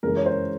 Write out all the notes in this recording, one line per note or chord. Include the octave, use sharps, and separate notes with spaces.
F#2 C#3 E3 G#3 A#4
C#5
C5